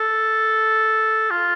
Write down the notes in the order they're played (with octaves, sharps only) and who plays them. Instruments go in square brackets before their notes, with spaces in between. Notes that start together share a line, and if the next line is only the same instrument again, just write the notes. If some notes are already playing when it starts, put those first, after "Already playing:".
Already playing: [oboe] A4
F4